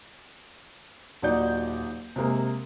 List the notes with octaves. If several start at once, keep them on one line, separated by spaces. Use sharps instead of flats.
D#1 F#3 D#4 D5 G6
C3 G#3 A#3